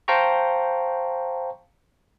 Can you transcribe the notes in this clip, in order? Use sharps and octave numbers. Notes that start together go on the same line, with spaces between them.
C5 F5 G5 A5 A#5 C#6